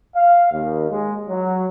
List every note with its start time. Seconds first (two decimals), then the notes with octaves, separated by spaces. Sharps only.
0.15 F5
0.52 D#2
0.90 G#3
1.29 F#3